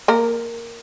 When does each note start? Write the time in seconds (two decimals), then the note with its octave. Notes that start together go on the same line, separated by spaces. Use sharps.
0.08 A#3 A#4